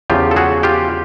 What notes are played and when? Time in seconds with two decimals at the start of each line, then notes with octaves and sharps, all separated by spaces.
0.10 E2 C#3 F3 F4 G4
0.31 A4
0.36 F#4 G#4
0.63 F4 G4